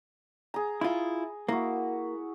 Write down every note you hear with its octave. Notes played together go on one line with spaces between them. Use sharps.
G#4 A#5
E4 F4
A#3 E4 F#4